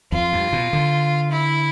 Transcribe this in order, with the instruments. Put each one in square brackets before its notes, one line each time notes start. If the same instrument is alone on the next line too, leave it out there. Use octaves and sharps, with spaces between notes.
[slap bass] F2 [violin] F4
[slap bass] G2
B2
D3
[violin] E4